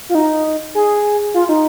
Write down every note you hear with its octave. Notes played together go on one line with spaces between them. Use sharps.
F4
D#4
G#4
F4
D#4